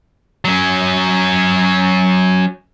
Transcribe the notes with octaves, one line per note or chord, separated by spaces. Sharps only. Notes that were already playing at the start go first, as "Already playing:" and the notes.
F#3 C#4